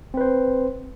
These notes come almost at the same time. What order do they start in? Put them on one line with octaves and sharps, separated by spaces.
C4 B4 C5